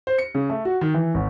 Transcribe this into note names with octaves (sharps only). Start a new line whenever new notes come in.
C5
C#7
C#3
A3
F#4
D#3
E3
G#1